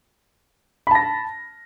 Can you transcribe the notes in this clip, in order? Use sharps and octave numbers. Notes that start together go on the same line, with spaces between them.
A5 B5 A#6